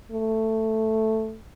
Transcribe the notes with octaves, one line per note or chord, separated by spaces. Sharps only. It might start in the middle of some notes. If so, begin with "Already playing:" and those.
A3